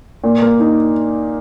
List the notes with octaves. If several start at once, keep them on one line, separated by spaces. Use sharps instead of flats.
A#2
A#3
D#4